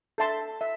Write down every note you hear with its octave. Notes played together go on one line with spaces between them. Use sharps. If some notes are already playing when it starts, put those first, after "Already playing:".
A4 E5 A5 C6
E5